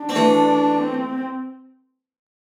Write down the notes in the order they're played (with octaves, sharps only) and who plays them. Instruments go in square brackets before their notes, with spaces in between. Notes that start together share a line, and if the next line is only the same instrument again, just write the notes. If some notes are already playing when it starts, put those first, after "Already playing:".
Already playing: [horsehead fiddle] D4
[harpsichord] C4
E3 A3
[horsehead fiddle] C4